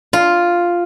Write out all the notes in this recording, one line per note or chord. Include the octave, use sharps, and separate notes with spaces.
F4